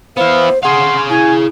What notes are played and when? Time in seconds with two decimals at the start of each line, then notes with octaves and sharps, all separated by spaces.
0.17 B3 E4 C5 F5
0.63 G#4 F5 F#5 C6
1.10 E4 G#5